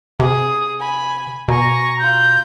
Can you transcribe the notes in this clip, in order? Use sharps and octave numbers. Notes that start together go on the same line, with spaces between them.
C3 G#4 D#6
G#5 B5
B2 G#5 A#5 C#6
F4 A#5 G6